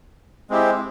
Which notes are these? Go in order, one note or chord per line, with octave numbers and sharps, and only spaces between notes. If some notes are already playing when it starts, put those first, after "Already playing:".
G#3 C4 E4 G4